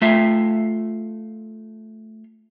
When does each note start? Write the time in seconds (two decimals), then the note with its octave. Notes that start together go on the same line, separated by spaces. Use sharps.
0.02 A3 F4 E5